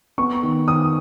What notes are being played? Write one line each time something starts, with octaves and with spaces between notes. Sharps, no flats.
B3 C#6
D#3
D#3 D#6